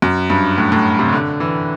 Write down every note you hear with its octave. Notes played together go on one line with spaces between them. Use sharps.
F#2
G2
A2
A2
C3
D3
E3